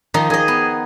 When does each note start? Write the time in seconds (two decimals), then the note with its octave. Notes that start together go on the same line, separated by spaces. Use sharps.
0.14 D#3 F3 D#4
0.30 D#3 G#4 D#5
0.48 B3